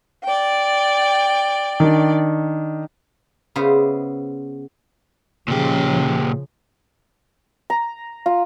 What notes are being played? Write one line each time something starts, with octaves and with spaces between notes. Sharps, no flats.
D5 G5
D#3 D4
C#3 B3 C5 E5
A#2 C#3 F3 G4
A#5
F4